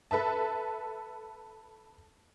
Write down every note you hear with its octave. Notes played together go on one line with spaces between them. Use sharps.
A4 B4 E5 A5